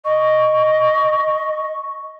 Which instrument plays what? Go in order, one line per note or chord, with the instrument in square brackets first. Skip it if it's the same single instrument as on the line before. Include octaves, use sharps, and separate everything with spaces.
[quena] D#5 [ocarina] C#6